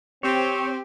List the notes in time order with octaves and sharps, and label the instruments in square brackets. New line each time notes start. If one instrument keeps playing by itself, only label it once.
[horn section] C4 [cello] G4 [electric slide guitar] C#5